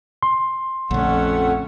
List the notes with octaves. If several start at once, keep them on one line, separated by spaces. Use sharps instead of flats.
C6
A#1 F2 D3 A3 C#4 F#5